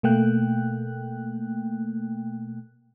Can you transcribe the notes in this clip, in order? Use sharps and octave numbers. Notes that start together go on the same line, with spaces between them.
B2 A3 A#3 G5 F#6